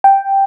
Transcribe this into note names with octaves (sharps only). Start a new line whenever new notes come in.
G5